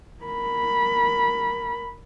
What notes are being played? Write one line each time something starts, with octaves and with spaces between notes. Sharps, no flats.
A#4 B5